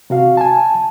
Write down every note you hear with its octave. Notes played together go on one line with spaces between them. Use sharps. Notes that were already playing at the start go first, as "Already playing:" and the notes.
C3 F#4 F5
G#5 A5